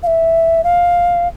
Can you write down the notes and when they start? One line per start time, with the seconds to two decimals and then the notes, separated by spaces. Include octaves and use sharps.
0.03 F5
0.07 E5
0.64 F5